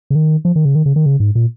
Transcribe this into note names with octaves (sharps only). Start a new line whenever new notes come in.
C#3
D#3
F3
D#3
C#3
D#3
C#3
D#3
C#3
G#2
A#2